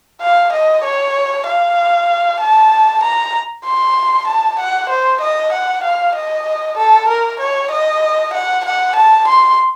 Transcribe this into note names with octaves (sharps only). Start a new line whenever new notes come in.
F5
D#5
C#5
F5
A5
A#5
C6
A5
F#5
C5
D#5
F#5
F5
D#5
A4
A#4
C#5
D#5
F#5
F#5
A5
C6